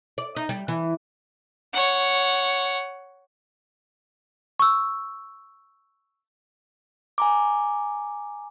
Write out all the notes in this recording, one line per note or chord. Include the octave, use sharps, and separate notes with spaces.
D5
D#4
G3
E3
C#5 F#5
C#6 E6
G#5 A#5 D6